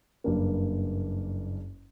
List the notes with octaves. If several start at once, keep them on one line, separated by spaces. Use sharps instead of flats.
F#1 G2 A#3